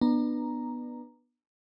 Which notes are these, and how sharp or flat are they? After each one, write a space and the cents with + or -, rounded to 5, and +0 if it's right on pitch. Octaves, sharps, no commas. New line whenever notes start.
B3 -10 D4 +35 A#5 +0